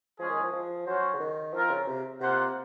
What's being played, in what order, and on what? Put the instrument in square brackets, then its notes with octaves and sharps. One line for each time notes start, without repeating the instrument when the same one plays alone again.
[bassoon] F3 [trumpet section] G#3 C#4 G#4
[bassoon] D#3
F3
F3
[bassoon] F#3 [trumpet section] C#4 F#4 C5
[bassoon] C#3
D#3
[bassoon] F3 [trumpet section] C4 F4 A#4
[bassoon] C#3
C3
[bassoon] C3 [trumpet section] A#3 F4 C5 F#5